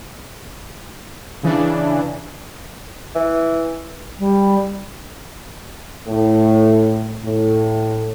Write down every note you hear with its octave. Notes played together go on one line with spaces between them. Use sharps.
C#3 E3 D4
E3
G3
A2
A2